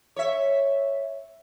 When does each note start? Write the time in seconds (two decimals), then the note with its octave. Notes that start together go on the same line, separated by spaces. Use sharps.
0.16 C#5 E5